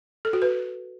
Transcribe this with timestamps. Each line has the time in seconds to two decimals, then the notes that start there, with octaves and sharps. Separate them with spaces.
0.25 A4
0.33 F#4
0.42 B4